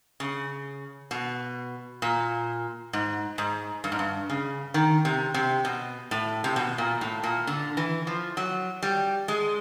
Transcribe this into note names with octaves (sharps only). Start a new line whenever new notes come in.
C#3
B2
A#2
G#2
G#2
G2
G#2
G2
C#3
D#3
C3
C3
B2
A2
C3
B2
A#2
A2
A#2
D3
E3
F3
F#3
G3
G#3